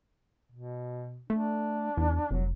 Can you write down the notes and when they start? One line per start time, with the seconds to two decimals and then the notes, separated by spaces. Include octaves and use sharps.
0.52 B2
1.30 A3 D4
1.97 E2
2.31 F1 F#3